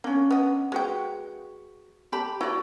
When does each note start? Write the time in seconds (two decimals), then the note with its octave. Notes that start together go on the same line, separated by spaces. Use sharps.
0.04 A#3 C#4 D4
0.31 B3 D#5
0.72 G#3 F#4 B4 G5
2.12 G4 A5 B5
2.41 E4 F#4 D5